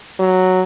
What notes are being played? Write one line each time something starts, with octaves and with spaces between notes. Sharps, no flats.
F#3